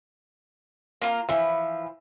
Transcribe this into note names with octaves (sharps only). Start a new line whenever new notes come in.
A#3 F4 A#5
E3 F3 E5